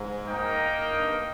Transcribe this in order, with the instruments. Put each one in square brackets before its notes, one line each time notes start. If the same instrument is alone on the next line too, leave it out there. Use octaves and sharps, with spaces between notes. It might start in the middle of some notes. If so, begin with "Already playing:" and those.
Already playing: [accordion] G#2
[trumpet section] A#3 D#4 A#4 D#5 G5
[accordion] F2
G2